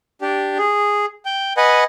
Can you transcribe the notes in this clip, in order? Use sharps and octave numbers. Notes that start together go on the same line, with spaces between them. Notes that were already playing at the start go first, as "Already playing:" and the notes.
D4 G4
G#4
G5
B4 D#5 F#5 G#5